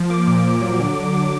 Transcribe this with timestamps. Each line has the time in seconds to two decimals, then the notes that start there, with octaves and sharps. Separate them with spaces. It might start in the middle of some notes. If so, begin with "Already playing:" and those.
Already playing: F3
0.10 A#3 D6
0.27 A#2
0.44 A#2
0.61 F#3
0.80 D3
0.96 D3
1.13 D3